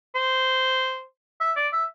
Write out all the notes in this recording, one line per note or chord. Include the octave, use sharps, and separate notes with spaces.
C5
E5
D5
E5